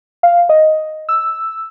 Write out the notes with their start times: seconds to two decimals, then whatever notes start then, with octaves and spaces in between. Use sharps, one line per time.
0.23 F5
0.49 D#5
1.09 E6